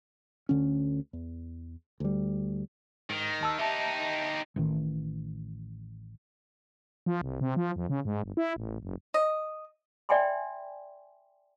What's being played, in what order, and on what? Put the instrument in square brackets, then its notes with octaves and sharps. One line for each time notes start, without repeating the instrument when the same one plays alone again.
[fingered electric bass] D2 D3 C#4
E2
D2 G3
[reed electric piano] G#2 [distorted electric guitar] D#3
[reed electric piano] D#2 A5 E6
[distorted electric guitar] D#4 G4 [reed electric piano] E5 A5
[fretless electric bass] A1 A2 D#3
[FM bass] F3
C2
C3
F3
F2
C#3
G#2
G1
E4
A1
F#1
[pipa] D#5
[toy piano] D5 E5 G5 G#5 B5 C6